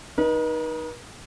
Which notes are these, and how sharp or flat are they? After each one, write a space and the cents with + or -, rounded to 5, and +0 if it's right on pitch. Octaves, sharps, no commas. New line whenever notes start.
D#4 +0 B4 -45